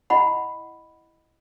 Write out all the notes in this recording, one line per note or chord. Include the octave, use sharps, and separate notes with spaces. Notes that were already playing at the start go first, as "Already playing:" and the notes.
E4 D#5 F#5 B5